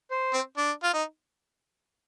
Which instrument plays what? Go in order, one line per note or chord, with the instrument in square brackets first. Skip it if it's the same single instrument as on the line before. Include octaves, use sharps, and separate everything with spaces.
[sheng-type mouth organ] C5
[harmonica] C4
D4
F4
D#4